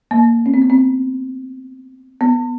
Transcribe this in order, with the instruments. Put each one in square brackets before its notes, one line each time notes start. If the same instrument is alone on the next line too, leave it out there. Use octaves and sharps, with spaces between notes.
[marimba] A#3
C#4
C4
B3
C4
B3